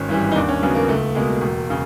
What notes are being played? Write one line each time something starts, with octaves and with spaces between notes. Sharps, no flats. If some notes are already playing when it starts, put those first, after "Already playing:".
Already playing: G#1 C#4
G2 E3 G3
D#4
D#2 D4
C#4
C#3 F#3 B3
A#3
C#2 A3
B2 G#3 A#3
E1
C#3